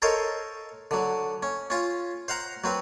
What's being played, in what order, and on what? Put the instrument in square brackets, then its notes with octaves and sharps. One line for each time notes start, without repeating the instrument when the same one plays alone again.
[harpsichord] A4 A#4 C5 C#5 D#5 F5
D3 F#3
C#4
C#4 F4
C5 F5 F#5 A#5
F#3 C4 B4